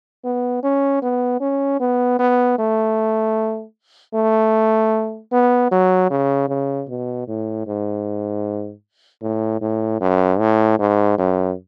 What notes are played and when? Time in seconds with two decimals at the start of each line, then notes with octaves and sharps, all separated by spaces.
0.24 B3
0.63 C#4
1.02 B3
1.41 C#4
1.80 B3
2.19 B3
2.59 A3
4.15 A3
5.32 B3
5.71 F#3
6.10 C#3
6.49 C#3
6.89 B2
7.28 A2
7.67 G#2
9.22 A2
9.61 A2
10.01 F#2
10.39 A2
10.79 G#2
11.18 F#2